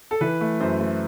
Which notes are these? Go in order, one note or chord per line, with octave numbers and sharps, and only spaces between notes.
A4
E3 B4
A3
F#2 C5
A3